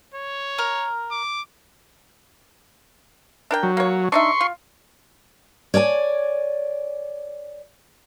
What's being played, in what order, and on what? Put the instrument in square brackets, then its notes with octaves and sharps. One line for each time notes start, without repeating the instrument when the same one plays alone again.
[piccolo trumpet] C#5
[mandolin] A#4
[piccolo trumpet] D6
[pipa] D4 A#4 G5
[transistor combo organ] F#3
[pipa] A#3 C#5
[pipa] D4 D#4 E5 [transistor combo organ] C6 C#6
[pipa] F4
[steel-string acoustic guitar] C#5 D5 F5 G#5